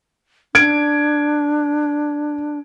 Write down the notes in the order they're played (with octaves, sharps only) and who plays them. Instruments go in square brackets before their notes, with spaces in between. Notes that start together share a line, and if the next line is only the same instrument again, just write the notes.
[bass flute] D4 [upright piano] G#6 D7